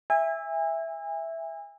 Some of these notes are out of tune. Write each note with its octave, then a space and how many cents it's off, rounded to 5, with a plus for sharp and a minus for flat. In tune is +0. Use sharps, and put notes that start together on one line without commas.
E5 +0 G#5 -35